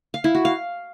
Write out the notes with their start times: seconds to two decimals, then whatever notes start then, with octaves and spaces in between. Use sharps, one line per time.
0.14 F5
0.24 E4
0.35 F#4
0.45 F5